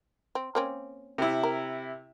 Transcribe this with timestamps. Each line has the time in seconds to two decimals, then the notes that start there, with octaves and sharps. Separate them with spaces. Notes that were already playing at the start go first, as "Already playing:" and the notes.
0.35 C4
0.55 A#3 C4 C#4
1.18 C3 E4
1.43 A#4